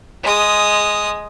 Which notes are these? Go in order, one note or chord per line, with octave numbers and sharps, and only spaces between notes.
G#3 D#6